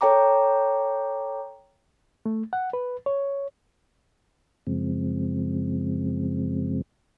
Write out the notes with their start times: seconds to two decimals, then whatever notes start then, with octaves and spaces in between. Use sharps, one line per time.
0.01 A4 C#5 G5 A#5 D6
2.26 A3
2.53 F#5
2.73 B4
3.06 C#5
4.67 F#2 C#3 F3 G#3 C4